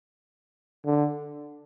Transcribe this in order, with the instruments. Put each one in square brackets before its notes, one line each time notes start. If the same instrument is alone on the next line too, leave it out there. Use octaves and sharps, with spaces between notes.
[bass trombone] D3